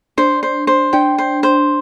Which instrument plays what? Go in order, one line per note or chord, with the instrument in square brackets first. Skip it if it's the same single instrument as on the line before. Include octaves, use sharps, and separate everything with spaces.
[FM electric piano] D4 [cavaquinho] C5
[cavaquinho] C5
C5
[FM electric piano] D4 [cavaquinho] G5
[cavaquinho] C5
C5